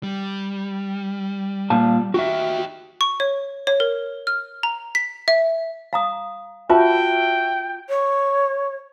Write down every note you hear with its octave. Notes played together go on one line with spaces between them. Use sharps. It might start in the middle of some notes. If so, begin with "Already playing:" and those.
G3
A#2 F5 A5
D#4 F#4 G4 E5
C#6
C#5
C#5
A#4
F6
A#5
B6
E5
F5 A#5 D#6
F4 F#4 B4 E5 G5 A5
C#5